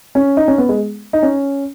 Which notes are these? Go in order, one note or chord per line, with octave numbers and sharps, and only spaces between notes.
C#4
D#4
C#4
B3
G#3
D#4
C#4